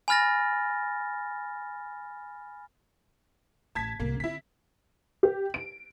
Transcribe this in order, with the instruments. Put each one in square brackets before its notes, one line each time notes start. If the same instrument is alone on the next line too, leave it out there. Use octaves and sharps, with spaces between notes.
[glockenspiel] G#5 B5 F6 A6 A#6
[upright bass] A1 [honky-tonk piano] A5 G#6 B6
[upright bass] C2 A2 [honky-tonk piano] A#3
[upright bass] D3 C4 [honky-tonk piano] E4 B6
[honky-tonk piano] G4
D7